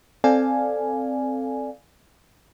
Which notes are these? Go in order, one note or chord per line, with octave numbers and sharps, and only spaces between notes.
C4 A4 D5 F5 G#5